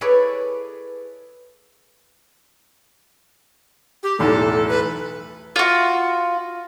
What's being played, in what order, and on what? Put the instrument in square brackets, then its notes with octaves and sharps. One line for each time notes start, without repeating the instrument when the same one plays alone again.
[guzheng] E4 G#4 A4 B4 C#5 D5
[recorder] G4
[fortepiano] B1 E2 A2 [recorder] A4
[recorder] B4
[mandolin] F4 F#4